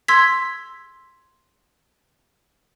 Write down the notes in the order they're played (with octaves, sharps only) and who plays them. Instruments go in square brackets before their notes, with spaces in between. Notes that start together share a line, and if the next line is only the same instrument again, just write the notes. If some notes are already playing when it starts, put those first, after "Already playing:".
[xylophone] C6 E6 G#6 B6